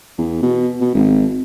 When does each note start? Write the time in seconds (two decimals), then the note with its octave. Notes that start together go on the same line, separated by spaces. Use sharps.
0.18 E2
0.42 B2
0.81 B2
0.95 G#1